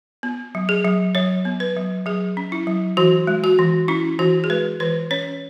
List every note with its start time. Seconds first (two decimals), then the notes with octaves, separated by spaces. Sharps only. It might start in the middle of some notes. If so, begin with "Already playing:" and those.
0.23 B3
0.55 F#3
0.69 G#4
0.85 F#3
1.15 F#3 C#5
1.45 B3
1.60 B4
1.76 F#3
2.06 F#3 G#4
2.37 C#4
2.52 E4
2.67 F#3
2.97 E3 F#4
3.27 G#3
3.44 F#4
3.59 E3
3.88 C#4 E4
4.19 E3 F#4
4.44 G#4
4.50 G#3 B4
4.80 E3 B4
5.11 C#4 C#5